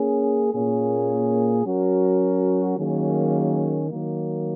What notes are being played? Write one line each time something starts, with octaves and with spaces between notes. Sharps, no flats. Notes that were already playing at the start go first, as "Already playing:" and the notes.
Already playing: A#3 C#4 G#4
A#2 A#3 C#4 G#4
F#3 C#4 F#4 A#4
D#3 F#3 A#3 C#4 G#4
D#3 F#3 A#3